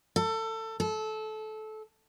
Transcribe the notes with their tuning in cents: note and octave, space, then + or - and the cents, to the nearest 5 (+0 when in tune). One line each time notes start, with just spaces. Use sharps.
A4 +25
A4 -20